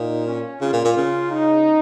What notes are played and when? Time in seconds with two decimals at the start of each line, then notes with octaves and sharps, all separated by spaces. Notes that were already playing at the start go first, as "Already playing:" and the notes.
Already playing: A#2 D#4
0.26 C#4
0.61 C#3 F4
0.73 A#2
0.84 A#2
0.97 C#3
1.31 D#4